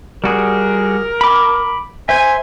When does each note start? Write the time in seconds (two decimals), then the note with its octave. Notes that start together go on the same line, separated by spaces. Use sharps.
0.24 G3 F#4 G#4 A#4
1.21 B5 D6
2.09 C5 E5 G#5